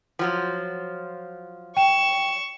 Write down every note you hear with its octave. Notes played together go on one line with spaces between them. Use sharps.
F3 F#3 F4
G5 C#6 E7